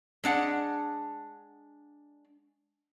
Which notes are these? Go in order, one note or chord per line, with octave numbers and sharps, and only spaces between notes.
G#3 D4 F#5